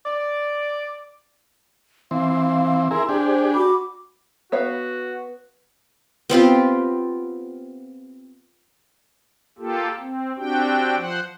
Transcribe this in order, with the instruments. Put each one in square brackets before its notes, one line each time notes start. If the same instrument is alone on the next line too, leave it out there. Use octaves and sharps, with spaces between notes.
[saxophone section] D5
[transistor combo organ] E3 C4 [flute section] F5
[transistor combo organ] E4 G#4 A#4 [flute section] C6
[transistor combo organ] D4 G4 G#4 [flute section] C5
[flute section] F#4 B5 D6
[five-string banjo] B3 C#5 F5 [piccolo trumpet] F#4
[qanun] B3 C4 F4 G4
[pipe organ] A#3 F4 G4 A4
C4
C4 D4 F#4 G4 G5
F3 C5 F#5